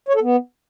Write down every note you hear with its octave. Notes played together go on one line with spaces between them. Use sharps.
C#5
A4
B3